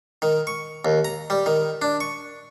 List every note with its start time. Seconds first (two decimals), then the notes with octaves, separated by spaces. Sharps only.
0.22 D#3
0.47 C#6
0.85 D#2
1.05 A#5
1.30 G3
1.46 D#3
1.82 D4
2.01 C#6